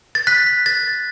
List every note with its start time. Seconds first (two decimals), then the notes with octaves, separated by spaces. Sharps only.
0.15 A6
0.27 F#6 B6
0.66 A6